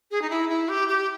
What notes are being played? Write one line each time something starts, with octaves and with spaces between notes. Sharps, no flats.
G#4
D#4
E4
E4
G4
G4